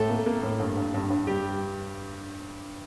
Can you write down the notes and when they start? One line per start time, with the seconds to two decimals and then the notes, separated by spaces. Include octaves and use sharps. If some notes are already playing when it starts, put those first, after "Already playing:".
Already playing: A2 A3 A4
0.09 A#3
0.26 A#3
0.43 A2
0.60 G2
0.77 G2
0.94 G2
1.10 G2
1.27 G3 G4